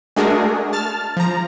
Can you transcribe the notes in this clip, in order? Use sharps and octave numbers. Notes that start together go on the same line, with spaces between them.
G#3 A3 D4 F#4 G#4 A#4
A5 F6 A6
F3 A#5